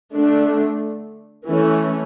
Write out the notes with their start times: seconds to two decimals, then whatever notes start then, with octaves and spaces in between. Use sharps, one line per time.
0.14 D3 A3 D4
1.46 E3 A3 C#4